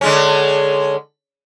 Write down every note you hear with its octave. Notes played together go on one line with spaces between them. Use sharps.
D3 G#3 C#4